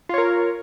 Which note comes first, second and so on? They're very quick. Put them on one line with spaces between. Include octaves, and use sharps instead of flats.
F4 C#5 A#4